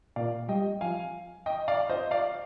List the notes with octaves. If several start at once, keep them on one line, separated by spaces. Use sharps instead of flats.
A#2 D5 F5
G3 D#5 G5
F3 F5 G#5
D#5 G5
D5 F5
C5 D#5
D5 F5